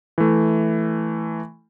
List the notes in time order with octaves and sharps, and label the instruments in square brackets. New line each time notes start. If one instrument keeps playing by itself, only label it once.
[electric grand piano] E3 A3